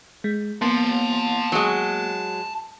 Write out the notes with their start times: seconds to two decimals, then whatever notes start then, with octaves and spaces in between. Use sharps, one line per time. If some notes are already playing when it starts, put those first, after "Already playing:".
0.24 G#3
0.62 A#3 B3 A5 C6
1.52 F#3 G#3